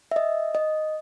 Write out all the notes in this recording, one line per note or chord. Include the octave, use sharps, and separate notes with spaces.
E5
D#5
D#5